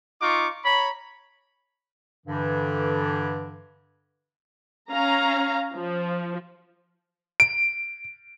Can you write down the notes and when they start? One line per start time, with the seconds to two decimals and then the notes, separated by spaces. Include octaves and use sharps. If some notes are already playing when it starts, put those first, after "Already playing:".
0.22 D#4 F4 C#6 D6
0.64 C#5 A#5 B5
2.26 G2 D3 E3
4.91 C#4 F5 A#5
5.74 F3
7.40 D7